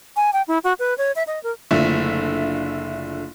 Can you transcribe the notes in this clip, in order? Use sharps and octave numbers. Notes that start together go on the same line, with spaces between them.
G#5
G5
E4
F#4
B4
C#5
E5
D#5
A#4
F#1 D3 A3 F4 E5